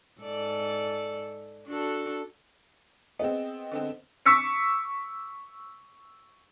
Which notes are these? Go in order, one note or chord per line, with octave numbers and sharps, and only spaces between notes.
G#2 A4 D5
D4 F#4 A4
B3 C4 G#4 D#5
D3 B3 C4
C#6 D6 E6 B6 C#7